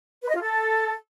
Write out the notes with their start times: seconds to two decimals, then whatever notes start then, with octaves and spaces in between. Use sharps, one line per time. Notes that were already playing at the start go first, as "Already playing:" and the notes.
0.22 B4
0.28 D#5
0.35 F4
0.42 A4